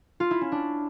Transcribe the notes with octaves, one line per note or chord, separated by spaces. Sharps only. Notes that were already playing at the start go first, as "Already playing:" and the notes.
F4
E4
C#4
D4